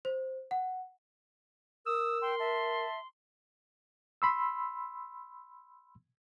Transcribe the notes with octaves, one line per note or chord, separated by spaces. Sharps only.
C5
F#5
A#4 D#6 E6
G5 C6
E5 A5
B5 C6 E6